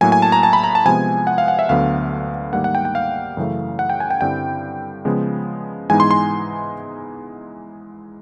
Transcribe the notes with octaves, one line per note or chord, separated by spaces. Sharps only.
A2 F#3 A#3 G#5
G#5
A5
A#5
A5
B5
A#5
A5
C3 F3 G#3 B3 G#5
F#5
F5
F#5
E5
D2 D3 F#3 B3 F5
G#2 D#3 G3 A#3 F#5
F#5
G5
G5
F5
F#2 C#3 E3 A3
F#5
G5
G#5
G5
G2 D3 G3 C4 E4 G5
C#3 F3 G#3 B3
G#2 E3 G#3 B3 D#4 G#5
C6
C6